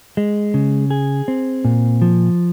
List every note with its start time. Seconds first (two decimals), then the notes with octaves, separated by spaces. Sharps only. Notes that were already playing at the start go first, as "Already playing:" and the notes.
0.17 G#3
0.54 C#3
0.90 G#4
1.28 C4
1.65 A#2
2.02 F3